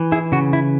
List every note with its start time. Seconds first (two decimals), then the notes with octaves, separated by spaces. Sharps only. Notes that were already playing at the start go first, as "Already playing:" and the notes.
Already playing: E3
0.12 E4 G#4
0.32 C#3 F#4
0.53 E4